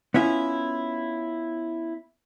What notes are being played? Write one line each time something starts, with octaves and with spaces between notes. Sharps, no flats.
B3 C#4 E4 F4